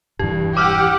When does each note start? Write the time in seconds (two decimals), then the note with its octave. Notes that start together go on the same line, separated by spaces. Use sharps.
0.19 E1 G2 E3 G4
0.57 G4 F#5 D6 E6 F6